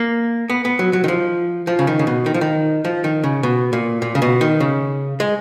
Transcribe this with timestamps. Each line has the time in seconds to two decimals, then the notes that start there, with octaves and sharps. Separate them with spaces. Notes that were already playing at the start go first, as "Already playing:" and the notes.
Already playing: A#3
0.50 B3
0.65 B3
0.79 F#3
0.93 F#3
1.04 D#3
1.08 F3
1.67 F3
1.79 C#3
1.87 D#3
1.99 C#3
2.07 B2
2.26 D#3
2.34 F3
2.41 D#3
2.85 F3
3.04 D#3
3.24 C#3
3.43 B2
3.73 A#2
4.02 A#2
4.15 C#3
4.22 B2
4.41 D#3
4.60 C#3
5.20 G#3